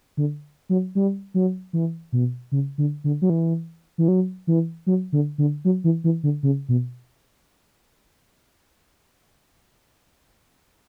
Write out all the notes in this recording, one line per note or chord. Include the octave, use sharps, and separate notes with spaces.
D3
F#3
G3
F#3
E3
B2
C#3
D3
D3
F#3
E3
E3
F#3
E3
F#3
D3
D3
F#3
E3
E3
D3
C#3
B2